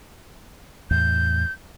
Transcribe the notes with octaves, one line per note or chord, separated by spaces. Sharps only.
E2 A2 G6